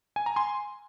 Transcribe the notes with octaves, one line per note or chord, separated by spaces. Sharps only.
G#5
A#5
G#5 C6